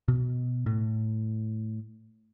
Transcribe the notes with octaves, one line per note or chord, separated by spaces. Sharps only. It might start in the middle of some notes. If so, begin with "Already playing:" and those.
B2
A2